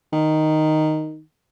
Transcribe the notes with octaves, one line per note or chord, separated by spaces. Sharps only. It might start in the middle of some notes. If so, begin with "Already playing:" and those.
D#3